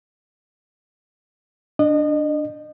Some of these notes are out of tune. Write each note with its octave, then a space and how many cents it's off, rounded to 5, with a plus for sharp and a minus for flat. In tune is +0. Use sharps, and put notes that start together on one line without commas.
D4 +5 D#5 -30